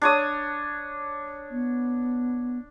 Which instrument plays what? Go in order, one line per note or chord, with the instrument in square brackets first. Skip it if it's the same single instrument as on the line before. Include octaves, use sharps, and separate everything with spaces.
[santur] D4 C#5 D#6
[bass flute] B3